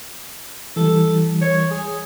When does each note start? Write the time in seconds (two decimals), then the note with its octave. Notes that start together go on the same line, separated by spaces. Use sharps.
0.76 E3 G3 A4
1.41 C#5
1.70 G#4